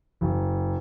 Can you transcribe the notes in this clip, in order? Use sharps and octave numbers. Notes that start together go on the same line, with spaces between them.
F#1